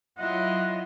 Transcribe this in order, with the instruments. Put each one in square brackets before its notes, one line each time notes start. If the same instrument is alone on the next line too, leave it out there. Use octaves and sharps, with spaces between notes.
[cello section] F#3 D#5 [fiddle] E4 F4 [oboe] F#5